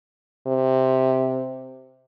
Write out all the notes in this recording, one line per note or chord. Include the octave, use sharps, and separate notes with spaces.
C3